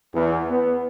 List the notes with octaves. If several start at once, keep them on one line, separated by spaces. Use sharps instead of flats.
E2
B3